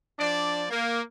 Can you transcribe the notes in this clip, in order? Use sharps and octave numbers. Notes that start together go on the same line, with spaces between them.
F3 D4 D5
A#3